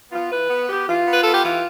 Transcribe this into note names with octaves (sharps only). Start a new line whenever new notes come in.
B3 F4
E3 B4
B3
B3 G4
E3 F4
B3 B4
B3 A4
G4
E3 F4